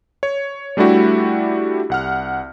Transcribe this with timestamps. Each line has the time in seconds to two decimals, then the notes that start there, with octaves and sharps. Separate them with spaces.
0.23 C#5
0.77 G3 A3 D4 E4 F#4 G4
1.90 C2 F#5 F6